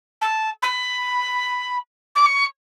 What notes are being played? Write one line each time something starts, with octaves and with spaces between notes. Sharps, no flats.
A5
B5
D6
C#6